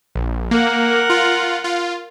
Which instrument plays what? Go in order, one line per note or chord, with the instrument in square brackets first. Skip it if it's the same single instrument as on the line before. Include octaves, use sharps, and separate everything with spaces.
[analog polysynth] A#1
[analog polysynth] A#3 [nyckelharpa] A#4 F#5
[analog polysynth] F4
F4